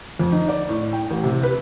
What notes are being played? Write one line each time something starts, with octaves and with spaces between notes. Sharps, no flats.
F2
D#4
D5
A2
G5
A1
C3
B4